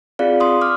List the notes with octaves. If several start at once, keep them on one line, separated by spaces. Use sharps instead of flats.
C4 F4 G#4 D5 F5
C6 D#6
D6 F6